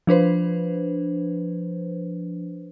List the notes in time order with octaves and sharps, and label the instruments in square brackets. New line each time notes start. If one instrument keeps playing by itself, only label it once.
[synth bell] F3 D4 B4 C5